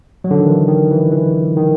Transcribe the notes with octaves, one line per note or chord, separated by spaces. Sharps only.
F#3
D3
D#3
E3
D#3
E3
E3
D#3